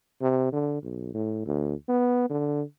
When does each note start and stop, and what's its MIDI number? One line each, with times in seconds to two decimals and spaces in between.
0.22 0.51 48
0.53 0.78 50
0.82 1.12 35
1.15 1.41 45
1.46 1.75 38
1.89 2.25 59
2.30 2.62 50